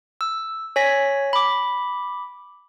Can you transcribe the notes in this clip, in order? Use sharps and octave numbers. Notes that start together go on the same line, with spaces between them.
E6
C#5 G#5 A#6 B6
B5 D6